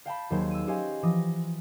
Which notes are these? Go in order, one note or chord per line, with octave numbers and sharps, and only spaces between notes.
F5 G5 A5 B5
D#2 F#3 G#4 C5
E6 D#7
C#4 G4 C5 D#5 F5 G#5
E3 F3 D6 D#6 A#6